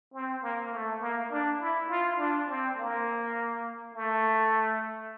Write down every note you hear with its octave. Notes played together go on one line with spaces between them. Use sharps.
C4
A#3
A3
A#3
D4
E4
F4
D4
C4
A#3
A3